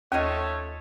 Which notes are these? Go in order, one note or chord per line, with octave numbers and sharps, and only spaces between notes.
D#2 A3 C#4 F4 C#5 D#5